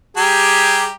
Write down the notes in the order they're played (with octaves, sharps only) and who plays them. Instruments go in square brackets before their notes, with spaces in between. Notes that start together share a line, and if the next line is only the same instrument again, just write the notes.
[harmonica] G3 G4 A#5 [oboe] G#4